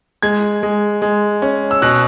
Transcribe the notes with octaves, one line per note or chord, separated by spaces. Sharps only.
G#3 G#6
G#3
G#3
C#4
E6
B2 F#6